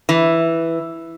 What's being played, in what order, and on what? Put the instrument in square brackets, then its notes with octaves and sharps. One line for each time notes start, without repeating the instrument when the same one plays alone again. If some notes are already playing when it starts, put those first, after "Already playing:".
[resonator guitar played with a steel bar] E3